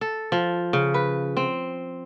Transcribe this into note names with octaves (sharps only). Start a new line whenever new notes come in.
A4
F3
C#3
B4
C4